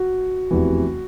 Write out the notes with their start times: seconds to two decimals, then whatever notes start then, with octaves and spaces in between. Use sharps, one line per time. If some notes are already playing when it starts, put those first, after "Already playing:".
Already playing: F#4
0.51 F1 E2 C3 E3